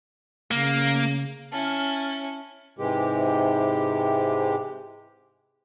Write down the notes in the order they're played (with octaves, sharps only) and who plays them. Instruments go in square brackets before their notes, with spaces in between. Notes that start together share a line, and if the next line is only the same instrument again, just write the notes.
[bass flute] C#3 [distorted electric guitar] A#3
[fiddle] C#4 E4 [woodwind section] A5 F6
[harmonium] G#2 C3 E3 G#3 G4